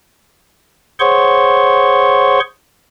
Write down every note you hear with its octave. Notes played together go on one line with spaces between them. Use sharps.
G#4 C5 C#5 F#5 C6 C#6